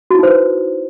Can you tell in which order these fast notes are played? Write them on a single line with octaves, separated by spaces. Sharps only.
F#4 E4 D#4 C5 B4